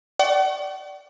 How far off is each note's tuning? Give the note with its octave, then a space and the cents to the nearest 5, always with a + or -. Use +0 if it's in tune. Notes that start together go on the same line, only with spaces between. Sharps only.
D5 +0 F#5 +45 C#6 +0